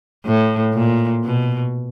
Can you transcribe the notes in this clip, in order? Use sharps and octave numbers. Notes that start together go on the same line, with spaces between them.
A2
A#2
B2